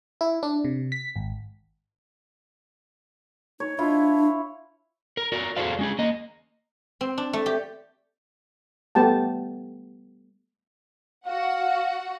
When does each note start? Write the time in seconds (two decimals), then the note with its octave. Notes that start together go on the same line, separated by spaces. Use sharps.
0.21 E4
0.43 D4
0.65 C3
0.92 B6
1.16 G#1
3.60 D#4 C#5
3.79 D4 E4 F4
5.17 A#4
5.32 F#4 A#4 D5
5.56 F#4 G#4 A4 C5 D5 F5
5.79 G#3 C#4 G#4
5.99 A#3 D#5
7.01 C4
7.18 D4
7.33 A3
7.46 G4
8.95 G3 A3 B3 G4 G5 A5
11.26 F#4 F5 F#5